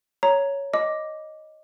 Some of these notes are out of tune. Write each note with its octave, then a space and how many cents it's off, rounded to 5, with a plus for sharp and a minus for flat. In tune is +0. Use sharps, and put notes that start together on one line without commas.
C#5 +5 A#5 +0
D#5 +0 D6 +0